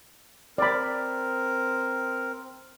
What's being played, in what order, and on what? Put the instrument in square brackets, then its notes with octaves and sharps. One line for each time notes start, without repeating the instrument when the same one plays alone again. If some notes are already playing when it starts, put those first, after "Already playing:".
[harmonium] C4 A#4 [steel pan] D5 B5